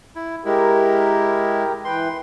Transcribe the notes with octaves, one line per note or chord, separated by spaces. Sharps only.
E4
G#3 E4 G4 A#4
E3 B4 G5 C6